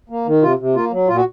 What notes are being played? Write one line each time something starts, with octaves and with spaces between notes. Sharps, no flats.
A#3
D#3
C3 F4
C3
A#3 F4
F#3
A#2 F4
F#4